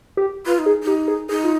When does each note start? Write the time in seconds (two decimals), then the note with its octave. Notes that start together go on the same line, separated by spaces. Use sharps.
0.17 G4
0.46 F4 B4
0.59 D#4
0.66 G#4
0.83 D#4 G4
1.08 G#4
1.29 D#4 G#4
1.44 F4